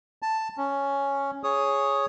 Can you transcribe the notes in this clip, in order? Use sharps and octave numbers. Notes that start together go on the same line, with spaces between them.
A5
C#4
G#4 C#5 D#6